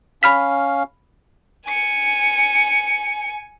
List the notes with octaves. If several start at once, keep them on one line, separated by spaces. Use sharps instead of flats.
C#4 F5 B5 F6 B6
G#5 C#7